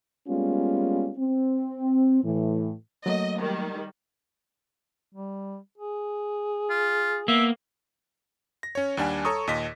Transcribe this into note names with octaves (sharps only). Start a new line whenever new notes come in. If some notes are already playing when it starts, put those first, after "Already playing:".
G3 G#3 A#3 B3 C#4 F4
C4
A2 E3
F#3 A3 A#3 D#5
D#3 G3
G3
G#4
F4
A#3 B3 E5
A#6
C#4 C#5
D#2 G3 D4 F#5 G#5
A4 C#5 A#5 C#6 D#6
D#2 A#2 D#5 B6